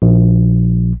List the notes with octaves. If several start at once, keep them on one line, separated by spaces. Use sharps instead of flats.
A#1